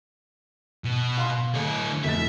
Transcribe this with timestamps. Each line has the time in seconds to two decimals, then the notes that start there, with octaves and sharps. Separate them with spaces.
0.84 B2
1.17 F5 C6
1.55 D2 A3 C#5
2.04 F1 A2 E5 A6